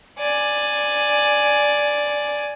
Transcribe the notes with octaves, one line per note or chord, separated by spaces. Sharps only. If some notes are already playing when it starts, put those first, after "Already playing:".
D5 G#5